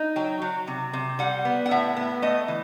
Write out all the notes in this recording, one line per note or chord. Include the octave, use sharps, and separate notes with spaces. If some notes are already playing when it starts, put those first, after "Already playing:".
Already playing: D#4
F#3 G5
F#3
C3
C3
G3 F#5
B3
F#5
A2 E5
B3
A3 D#5
E3